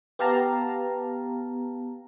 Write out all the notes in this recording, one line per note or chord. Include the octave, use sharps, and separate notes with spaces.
B3 G4 F5 A5 A#5